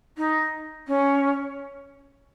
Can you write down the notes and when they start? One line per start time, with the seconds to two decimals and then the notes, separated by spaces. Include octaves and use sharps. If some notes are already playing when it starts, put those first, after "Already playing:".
0.17 D#4
0.87 C#4